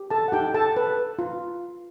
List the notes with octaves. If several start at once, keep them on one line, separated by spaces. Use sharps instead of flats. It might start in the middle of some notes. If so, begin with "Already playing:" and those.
Already playing: G4
A4 A5
F#5
D#4 G4 G5
A4 A5
B4
F4